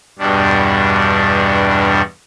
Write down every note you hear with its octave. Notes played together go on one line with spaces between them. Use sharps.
E2 G2 B2 G3 D4